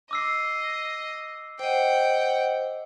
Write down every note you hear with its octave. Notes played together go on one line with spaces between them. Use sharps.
D#5 D6 E6 C7
C5 D#5 F#5 G5